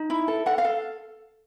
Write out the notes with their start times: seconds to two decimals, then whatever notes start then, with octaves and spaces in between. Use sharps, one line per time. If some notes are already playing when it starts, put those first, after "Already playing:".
Already playing: D#4
0.10 E4
0.28 A4
0.46 A4 F#5
0.58 F5
0.65 A4